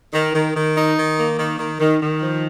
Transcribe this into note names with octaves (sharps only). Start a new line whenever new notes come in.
D#3
D#3
D#3
D#4
D#3
A#3
D#3
D#3
D#3
D#3
F3